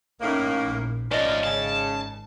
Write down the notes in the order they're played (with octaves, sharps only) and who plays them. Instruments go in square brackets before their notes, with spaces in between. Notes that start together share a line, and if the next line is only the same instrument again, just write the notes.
[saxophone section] A2 A#3 [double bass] C#4 D#4
[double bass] A#1
[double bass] G#1 [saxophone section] F3 C#4 [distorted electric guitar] A3 D4 [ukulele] D5 D#5
[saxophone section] C#3 [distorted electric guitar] A5